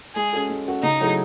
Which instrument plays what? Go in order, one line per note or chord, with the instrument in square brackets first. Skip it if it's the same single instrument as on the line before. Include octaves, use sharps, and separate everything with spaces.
[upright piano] G#3 [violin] G#4
[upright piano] C#4 F#4 A4
G#3
C#4 F#4 A4
[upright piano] C#3 [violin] D#4
[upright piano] F#3 A3 E4 G#4